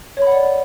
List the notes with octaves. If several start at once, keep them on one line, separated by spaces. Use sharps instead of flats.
C#5
B5
F#5
D5